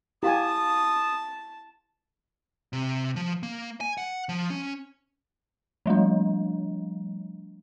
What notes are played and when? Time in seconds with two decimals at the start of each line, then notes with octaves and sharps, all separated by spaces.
0.23 E4 G4 F5 G#5 A5 C#6 D#6
2.73 C3
3.16 F3
3.43 A#3
3.81 G#5
3.98 F#5
4.29 F3
4.50 C#4
5.86 F3 G3 A3 D4